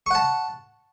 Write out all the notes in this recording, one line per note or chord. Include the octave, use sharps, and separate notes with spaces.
F#5 A5 C#6